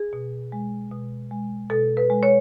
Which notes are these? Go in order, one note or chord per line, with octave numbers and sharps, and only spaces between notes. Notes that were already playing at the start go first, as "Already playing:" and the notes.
Already playing: G#4
B2
G#3
B2
G#3
B2 A4
B4
G#3
C#5